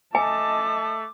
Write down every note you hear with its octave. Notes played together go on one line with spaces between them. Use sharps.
A3 D#5 G#5 A5 D6